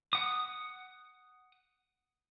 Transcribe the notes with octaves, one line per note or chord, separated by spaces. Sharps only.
F#5 D#6